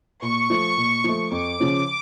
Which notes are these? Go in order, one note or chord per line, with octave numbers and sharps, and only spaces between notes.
A#2 C#6
F3 A3
A#2
F3 A3
F2 D6
C#3 F3 C#4